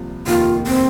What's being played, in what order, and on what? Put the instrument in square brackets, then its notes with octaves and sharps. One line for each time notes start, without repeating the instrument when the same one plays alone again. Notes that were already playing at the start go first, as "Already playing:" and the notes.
Already playing: [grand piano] C2 A#2 F3
[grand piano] F1 D#2 D#3 A#3 [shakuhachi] F4
[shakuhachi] C4